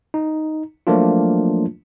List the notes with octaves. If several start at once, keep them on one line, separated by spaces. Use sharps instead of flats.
D#4
F3 F#3 A3 A#3 D4 F4